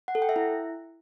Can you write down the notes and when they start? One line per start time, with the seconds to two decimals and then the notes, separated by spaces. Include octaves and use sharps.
0.08 F#5
0.15 A4
0.22 G5
0.29 E5
0.36 E4